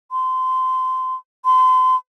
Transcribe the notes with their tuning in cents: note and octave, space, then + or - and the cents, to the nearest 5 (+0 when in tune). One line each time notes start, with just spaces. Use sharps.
C6 -25
C6 -35